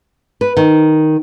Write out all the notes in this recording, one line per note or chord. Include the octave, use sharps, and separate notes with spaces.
B4
D#3